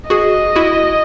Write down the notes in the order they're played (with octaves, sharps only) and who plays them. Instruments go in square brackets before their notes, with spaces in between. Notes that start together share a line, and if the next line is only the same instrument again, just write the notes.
[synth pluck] F#4 G#4 [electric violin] D#5
[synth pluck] E4 F#4